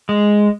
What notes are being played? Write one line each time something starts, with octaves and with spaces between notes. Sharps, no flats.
G#3